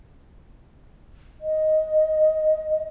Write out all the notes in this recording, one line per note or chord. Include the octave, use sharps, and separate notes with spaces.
D#5